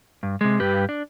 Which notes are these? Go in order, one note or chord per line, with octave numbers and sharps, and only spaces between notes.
G2
C3 G#3
G2 G4 B4
D4